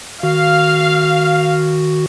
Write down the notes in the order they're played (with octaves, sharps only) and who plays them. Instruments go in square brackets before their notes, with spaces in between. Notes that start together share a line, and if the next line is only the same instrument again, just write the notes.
[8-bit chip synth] D#3 F#4 [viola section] F5